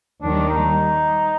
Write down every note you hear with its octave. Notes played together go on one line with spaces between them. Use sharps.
D#2 D#3 G3 D4
D#4